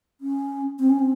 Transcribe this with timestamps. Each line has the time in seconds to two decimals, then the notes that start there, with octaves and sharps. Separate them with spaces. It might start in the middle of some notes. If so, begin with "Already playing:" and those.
0.21 C#4
0.79 C4
0.90 C#4
0.99 C4